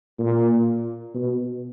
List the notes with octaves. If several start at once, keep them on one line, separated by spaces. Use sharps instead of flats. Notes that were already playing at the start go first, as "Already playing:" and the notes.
A#2
B2